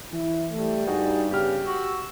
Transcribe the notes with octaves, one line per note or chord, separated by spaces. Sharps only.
E3 E4
G3 A3
G2 D#4 F#4 G#4
C#3 B3 G4 F6
F#4 E6